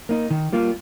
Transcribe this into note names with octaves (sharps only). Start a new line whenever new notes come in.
A#3 D#4
D#3
G3 A#3 F4